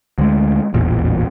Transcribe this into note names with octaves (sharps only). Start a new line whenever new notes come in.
D2 G#3
D#1 A1 E2 A#2